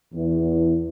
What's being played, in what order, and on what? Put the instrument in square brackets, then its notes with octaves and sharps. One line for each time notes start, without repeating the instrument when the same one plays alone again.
[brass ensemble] E2